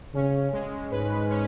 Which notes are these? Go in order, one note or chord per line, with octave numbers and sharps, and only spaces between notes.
C#3 C#4
G#3
G#2 B4
C#4